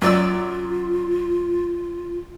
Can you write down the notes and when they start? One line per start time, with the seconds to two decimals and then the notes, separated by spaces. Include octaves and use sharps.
0.02 F#2 F4 D5 E6